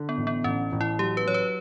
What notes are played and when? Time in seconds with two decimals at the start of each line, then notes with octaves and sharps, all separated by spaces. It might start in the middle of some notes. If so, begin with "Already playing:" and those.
Already playing: D3
0.09 B3
0.17 A1
0.27 B3
0.44 A1 C#4
0.72 A1
0.81 E4
0.99 F#3 G4
1.17 B4
1.26 F#3 C#5
1.34 B4